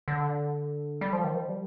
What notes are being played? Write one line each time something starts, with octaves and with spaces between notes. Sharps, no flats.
D3
G3
F3
D#3
F3
G3